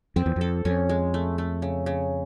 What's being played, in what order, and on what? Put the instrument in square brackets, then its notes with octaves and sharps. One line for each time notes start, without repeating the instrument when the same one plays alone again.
[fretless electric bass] F2 [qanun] C4
[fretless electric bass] E2
[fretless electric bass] F2 [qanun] A4
[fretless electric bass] F2 [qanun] C#4
[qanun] G#3
A3
A3
C#3
C#3